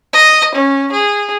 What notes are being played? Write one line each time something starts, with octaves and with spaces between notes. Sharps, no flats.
D#5
C#4
G#4